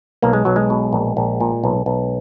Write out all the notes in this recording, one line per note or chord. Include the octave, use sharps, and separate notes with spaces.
B1 A#3
G#3
B1 F#3
G#3
B2
A#1
A#1
A#2
B1
B1